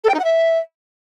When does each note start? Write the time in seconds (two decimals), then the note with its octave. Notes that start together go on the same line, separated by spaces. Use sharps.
0.04 A4
0.09 G5
0.14 D#4
0.19 F#5
0.24 E5